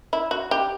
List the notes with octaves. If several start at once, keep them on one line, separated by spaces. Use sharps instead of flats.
E4
F#4
G4